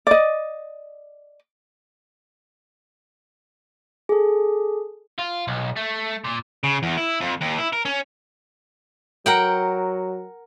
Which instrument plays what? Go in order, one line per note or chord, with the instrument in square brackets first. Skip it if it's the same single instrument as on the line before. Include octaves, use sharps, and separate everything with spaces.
[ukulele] D5 D#5
[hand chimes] G#4 A4
[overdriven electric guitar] F4
B1
A3
A#2
C#3
E2
E4
F2
D#2
E4
A#4
C#4
[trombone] F#3 [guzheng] A#4 F#5 G5